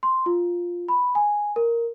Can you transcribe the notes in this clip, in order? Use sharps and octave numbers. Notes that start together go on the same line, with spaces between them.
C6
F4
B5
G#5
A#4